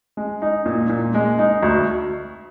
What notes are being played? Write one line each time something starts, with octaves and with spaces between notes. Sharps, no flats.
G#3
D#4
A#2
A#2
G#3
D#4
D2